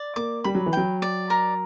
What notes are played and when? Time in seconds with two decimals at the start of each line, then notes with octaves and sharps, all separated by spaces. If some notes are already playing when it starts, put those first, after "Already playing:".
Already playing: D5
0.16 A#3 D6
0.44 G3 B5
0.55 F#3
0.66 E3
0.73 F#3 G5
1.02 D5
1.30 A#4